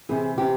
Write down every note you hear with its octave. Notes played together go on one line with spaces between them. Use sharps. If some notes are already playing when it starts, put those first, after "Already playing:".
C3 E3 G#4
C3 E3 G4